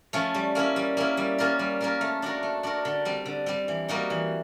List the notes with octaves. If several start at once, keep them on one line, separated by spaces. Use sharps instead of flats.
F3 A3 C#4
G3
A#3 C#4 E4
G3
A#3 C#4 E4
G3
A#3 C#4 F4 A#4
G3
A#3 C#4 F4 A#4
A3
D4 F#4 A#4
A3
D4 F#4 A#4
D3
G3 C4
D3
G3 C4
E3
G3 A#3 D#4 F#4
E3